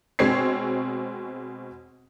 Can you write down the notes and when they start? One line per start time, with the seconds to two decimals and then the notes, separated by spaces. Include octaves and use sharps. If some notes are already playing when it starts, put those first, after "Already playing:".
0.19 B2 G#3 C4 C#5 G#6 C7